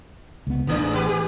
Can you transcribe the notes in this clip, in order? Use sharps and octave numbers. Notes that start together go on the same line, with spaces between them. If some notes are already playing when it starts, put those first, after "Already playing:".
C#2 B3
A1 G#2 E3 A3 D4
B3 G4 B4
G4 G#4